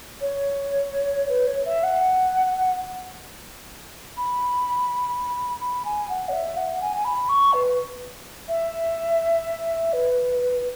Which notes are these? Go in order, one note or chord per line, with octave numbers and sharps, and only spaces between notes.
C#5
B4
C#5
E5
F#5
B5
B5
G#5
F#5
C#5
E5
F#5
G#5
G#5
B5
C#6
B4
E5
B4